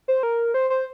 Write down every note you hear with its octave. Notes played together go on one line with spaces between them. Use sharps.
C5
A#4
C5
C5